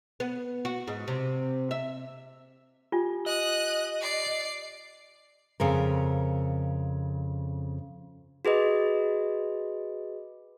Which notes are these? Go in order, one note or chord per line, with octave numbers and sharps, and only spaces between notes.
B3
F#4
G#2
C3
E5
F4 G4 G#5
D#5 D#6 F#6
D5 C7
F2 C#3 C4 A#4
F#4 G#4 B4 D#5